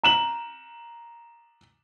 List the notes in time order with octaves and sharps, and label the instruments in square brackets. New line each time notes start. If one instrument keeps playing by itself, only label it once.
[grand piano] A#5 E7 F#7